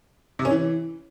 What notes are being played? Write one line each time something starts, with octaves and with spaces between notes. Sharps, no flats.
C3
C#4
E3